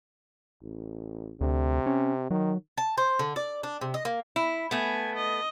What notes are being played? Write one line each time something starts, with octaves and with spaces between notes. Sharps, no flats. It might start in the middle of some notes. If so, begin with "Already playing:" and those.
A1
D2 C3
C#4
D#3 F#3
A5
C5
D3
D5
D4
C3
D#5
A#3
E4
A3 B3 G#5
D#5